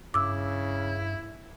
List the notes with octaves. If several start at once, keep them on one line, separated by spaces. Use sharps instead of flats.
G2 C#3 E4 D6 E6